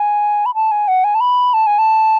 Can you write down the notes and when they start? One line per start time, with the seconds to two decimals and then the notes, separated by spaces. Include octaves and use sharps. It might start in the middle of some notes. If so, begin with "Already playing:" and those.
Already playing: G#5
0.46 B5
0.55 A5
0.71 G#5
0.88 F#5
1.04 G#5
1.15 A5
1.21 B5
1.54 A5
1.67 G#5
1.79 A5